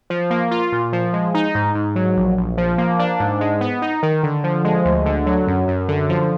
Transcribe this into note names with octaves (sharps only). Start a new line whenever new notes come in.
F3
A#3
F4
A#2
F3
G#3
D#4
G#2
G#2
F#3
A#1
A#1
F3
A#3
D4
G#2
G#3
B3
D#4
D#3
D3
F3
G#3
D2
D3
F#3
F#2
F#2
D3
F3